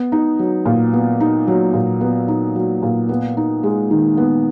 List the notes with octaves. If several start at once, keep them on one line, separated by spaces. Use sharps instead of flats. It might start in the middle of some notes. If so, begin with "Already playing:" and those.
Already playing: B3
D#4
F#3
A#2
B3
D#4
F#3
A#2
B3
D#4
F#3
A#2
B3
D#4
G#3
D#3
B3